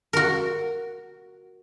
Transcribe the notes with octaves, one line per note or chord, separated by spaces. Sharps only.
F#4 A#4